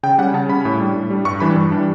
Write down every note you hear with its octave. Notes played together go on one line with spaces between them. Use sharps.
C#3 G5
G3 C#4 F#5
C#3 A5
G3 C#4 B5
A2
G3 D4
A2
G3 D4
G2 C#6
E3 G3 D4 B5
G2
E3 G3 D4